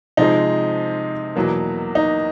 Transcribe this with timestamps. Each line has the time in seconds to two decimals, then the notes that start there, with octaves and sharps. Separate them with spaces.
0.17 C3 F3 G#3 D#4
1.36 E2 B2 F#3 A#3
1.95 D#4